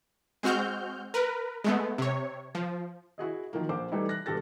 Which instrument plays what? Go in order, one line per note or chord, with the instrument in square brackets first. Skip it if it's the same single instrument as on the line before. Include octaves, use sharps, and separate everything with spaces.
[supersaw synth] G#3 C4 F#4 F6 G6
A#4 B4
G#3 A3 B3
C3 C#5
F3
[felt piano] E4 F#4 G#4 D#5
D#3 F3 F#3 A#3
A#1 C5 D6
E3 G3 A3 D#4 E4
F#6 A#6
E1 G2 G3 A4 A6 A#6